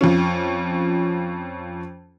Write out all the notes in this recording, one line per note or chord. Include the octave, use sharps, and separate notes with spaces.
F2 F3 C#4